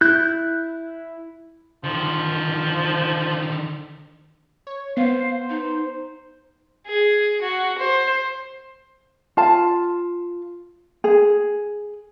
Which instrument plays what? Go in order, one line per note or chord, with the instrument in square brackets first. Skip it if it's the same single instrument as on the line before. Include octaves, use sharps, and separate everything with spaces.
[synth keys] E4 [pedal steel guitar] F#6 G6
[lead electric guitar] D3 D#3 [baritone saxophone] F3
[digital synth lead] C#5
[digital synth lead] B3 [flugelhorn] C5 [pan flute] F5
[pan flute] D#4
[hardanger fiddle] G#4
F#4
C5
[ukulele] F4 A5
G#4